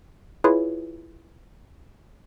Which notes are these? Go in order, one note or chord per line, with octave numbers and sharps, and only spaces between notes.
E4 F4 G#4 B4 C#5